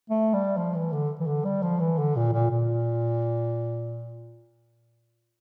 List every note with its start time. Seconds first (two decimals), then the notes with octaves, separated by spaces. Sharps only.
0.10 A3
0.34 G3
0.57 F3
0.75 E3
0.93 D3
1.20 E3
1.27 D3
1.45 G3
1.63 F3
1.80 E3
1.98 D3
2.16 A#2
2.33 A#2
2.51 A#2